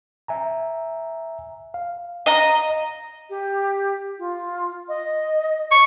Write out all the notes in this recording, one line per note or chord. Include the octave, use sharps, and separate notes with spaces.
E5 G#5 A#5
F5
D#5 A#5
G4
F4
D#5
C#6